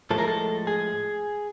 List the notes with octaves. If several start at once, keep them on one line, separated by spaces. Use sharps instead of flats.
A2 F3 G#3 A4
A#4
A4
G#4